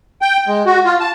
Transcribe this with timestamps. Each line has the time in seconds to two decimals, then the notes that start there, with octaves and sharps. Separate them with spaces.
0.22 G5
0.48 G#3
0.66 F#4
0.85 F4
1.00 A5